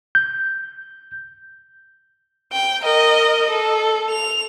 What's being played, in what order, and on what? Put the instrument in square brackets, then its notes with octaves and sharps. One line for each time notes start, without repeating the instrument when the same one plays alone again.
[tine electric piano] G6
[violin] G5
A#4 D#5
A4
F7